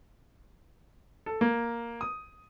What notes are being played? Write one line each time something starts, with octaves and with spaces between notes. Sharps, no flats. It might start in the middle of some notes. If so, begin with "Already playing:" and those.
A4
A#3
D#6